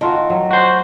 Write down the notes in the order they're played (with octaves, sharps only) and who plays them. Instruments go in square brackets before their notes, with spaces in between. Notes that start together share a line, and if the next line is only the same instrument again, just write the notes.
[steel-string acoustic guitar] D#3 [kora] A3 F4 F#4
[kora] F#3
[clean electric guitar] F#4 C5